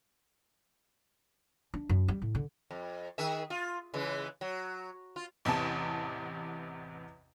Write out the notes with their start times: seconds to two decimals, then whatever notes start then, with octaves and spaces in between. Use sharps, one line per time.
1.74 D4
1.89 F#2
2.08 G3
2.22 A2
2.35 D3
2.71 F2
3.18 D#3 G#4 E5
3.50 F4
3.94 C#3 E3 G#3
4.41 F#3
5.16 F4
5.45 A1 E2 C3 A5